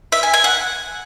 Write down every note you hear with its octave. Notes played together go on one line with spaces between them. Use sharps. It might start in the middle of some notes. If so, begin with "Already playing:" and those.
E5
G#5
G#5
F#5